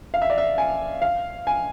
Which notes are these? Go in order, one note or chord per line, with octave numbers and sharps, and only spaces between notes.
F5
E5
D5
E5
G#5
F5
G#5